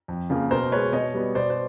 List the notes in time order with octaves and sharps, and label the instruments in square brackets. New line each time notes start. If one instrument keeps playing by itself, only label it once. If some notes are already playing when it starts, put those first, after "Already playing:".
[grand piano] F2
C#3 F3 A#3
B2 A#4 C5
G#3 B3 B4 C#5
B2 C#5 D#5
G3 B3
B2 C5 D5
C5